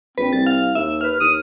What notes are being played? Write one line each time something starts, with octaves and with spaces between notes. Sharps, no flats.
A#1 C4 B4
C2 A6
F5
D#2 E5
B4 F6
D#2 D#6